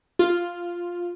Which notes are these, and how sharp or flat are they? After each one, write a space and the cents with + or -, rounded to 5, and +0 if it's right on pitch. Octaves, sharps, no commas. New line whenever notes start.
F4 +0